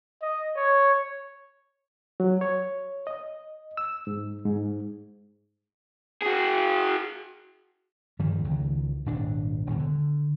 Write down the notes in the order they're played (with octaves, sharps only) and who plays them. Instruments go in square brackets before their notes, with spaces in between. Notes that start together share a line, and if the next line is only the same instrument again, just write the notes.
[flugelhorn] D#5
C#5
[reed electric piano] F#3
C#5
D#5
E6
G#2
G#2
[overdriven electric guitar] F#4 G#4
[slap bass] G2 D#3 F3 G3
C#2 D#3
D#1 G#1 D4
D#1 B2 D#3
D3